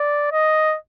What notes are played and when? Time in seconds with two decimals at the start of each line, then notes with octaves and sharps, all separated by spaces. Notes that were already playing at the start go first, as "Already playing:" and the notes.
Already playing: D5
0.32 D#5